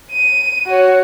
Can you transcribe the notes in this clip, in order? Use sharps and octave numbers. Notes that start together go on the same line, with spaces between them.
D#7
F#4 C#5